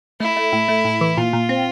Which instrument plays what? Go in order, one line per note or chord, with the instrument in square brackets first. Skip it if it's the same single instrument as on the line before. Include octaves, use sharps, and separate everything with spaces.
[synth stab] A3 [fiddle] E4
[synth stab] A3
A2
A3
A2
E3
[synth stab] A#2 [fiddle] F4
[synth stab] A#2
C4